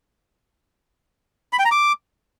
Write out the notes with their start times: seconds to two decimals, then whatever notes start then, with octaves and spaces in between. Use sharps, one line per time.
1.53 B5
1.59 G5
1.65 A#5
1.71 D6